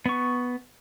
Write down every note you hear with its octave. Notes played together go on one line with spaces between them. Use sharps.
B3 C#6